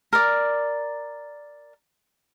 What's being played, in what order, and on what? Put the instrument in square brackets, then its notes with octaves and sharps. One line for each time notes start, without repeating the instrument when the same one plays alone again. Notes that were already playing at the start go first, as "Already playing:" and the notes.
[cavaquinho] A#4 D5